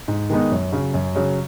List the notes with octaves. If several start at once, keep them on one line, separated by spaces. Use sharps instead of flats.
G#2
D#3 G#3 B3 D#4
F#2
C#3 F#3
F#2
C#3 F#3